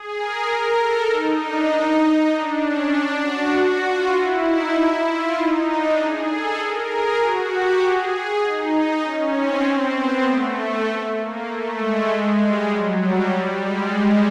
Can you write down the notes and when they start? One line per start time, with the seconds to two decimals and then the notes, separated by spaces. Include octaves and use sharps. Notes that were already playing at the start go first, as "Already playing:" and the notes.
Already playing: G#4
0.17 A#4
0.77 A4
1.09 D#4
1.39 D4
1.70 D#4
2.30 D4
2.61 C#4
2.92 D4
3.22 F#4
3.83 F4
4.14 E4
4.45 D#4
4.74 E4
5.06 F4
5.35 D#4
5.67 D4
5.98 G#4
6.28 A4
6.58 A#4
6.88 G#4
7.19 F#4
7.51 G4
7.80 G#4
8.41 D#4
9.02 C#4
9.33 C4
9.64 C4
9.94 B3
10.25 A3
11.16 A#3
11.47 A3
11.77 G#3
12.08 G#3
12.39 G3
12.69 F#3
13.00 G3
13.30 G3
13.61 G#3